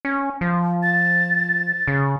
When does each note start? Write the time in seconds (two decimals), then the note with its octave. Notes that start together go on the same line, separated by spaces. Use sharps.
0.05 C#4
0.41 F3
0.83 A6
1.88 C#3